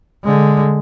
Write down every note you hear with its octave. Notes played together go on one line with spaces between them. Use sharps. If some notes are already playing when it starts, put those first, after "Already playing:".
D3 G#3